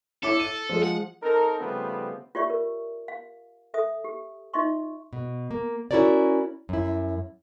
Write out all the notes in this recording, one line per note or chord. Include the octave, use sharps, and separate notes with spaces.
E4 A4 C#5 D6
D#7
F3 G#3
F#5
C4 D#4 A4 A#4
C#3 F3 G3 A3 B3 C4
F4 G4 C#5 D5 E5 C#6
A#4
F5
A4 E5 D#6
G4
D#4 F4 D#5 E5 C6 C#6
B2
A#3
C#4 E4 F#4 A#4 C#5 D5
F#2 E4